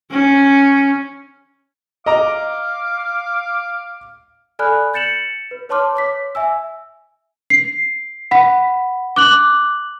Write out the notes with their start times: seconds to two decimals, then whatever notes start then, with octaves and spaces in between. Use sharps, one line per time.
0.11 C#4
2.06 D#5 F5 A#5 D6
4.59 A4 D5 G#5 B5 F6 F#6
4.94 G6 A6 C#7 E7 F#7
5.51 B4
5.69 B4 C#5 A5 C6 D6 F6
5.95 C#5 D6 B6
6.35 E5 G#5 E6
7.50 C7
8.31 F#5 B5 B6
9.16 D6 F#6 F#7